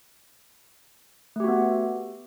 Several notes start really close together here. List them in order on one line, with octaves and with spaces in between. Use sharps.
A3 G4 F#4 B3